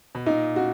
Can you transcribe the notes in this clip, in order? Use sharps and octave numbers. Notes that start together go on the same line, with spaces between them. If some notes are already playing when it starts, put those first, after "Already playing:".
B2
A#2 D#4
F#4